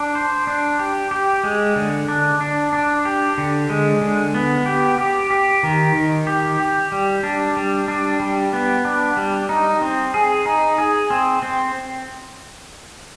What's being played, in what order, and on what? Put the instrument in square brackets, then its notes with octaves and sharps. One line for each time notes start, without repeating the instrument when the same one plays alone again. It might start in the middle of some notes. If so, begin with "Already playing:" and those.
Already playing: [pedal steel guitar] D4
C5
D4
G4
G4
G#3
D3
D4
D4
D4
G4
D3
G#3
D3
B3
G4
G4
G4
D#3
D#3
G4
G4
G3
D4
G3
D4
G3
B3
D4
G3
D#4
C4
G#4
D#4
G#4
C4
C4